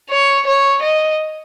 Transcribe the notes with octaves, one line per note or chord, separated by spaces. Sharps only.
C#5
C#5
D#5